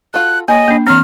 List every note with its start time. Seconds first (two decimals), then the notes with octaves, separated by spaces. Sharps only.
0.14 F4 F#4 A4 F#6
0.48 A#3 G#4 B4 C#5 D#5
0.68 A#3 D4
0.87 E3 F#3 C4 F6